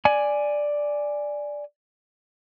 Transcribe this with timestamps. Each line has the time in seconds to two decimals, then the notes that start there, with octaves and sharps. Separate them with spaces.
0.05 D5 G#5